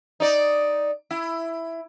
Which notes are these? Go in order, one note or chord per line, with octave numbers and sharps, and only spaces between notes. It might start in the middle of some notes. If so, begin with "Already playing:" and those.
D#4 D5
E4